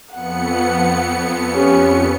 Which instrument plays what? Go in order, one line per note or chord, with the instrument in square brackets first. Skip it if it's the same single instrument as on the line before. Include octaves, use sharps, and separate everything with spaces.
[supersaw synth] F2 B3 C#7 [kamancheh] F#5
[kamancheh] C#4 [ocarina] G4